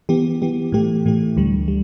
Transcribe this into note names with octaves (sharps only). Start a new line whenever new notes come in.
E3 B3 G4
E3 B3 G4
A2 E3 A3 G4
A2 E3 A3 G4
D2 D3 G3
G3